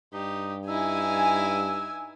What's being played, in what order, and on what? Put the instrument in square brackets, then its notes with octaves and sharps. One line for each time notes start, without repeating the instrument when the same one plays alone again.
[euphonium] G2 [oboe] D#4 [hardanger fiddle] G4
[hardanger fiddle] D#4 E4 [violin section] G#5 [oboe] E6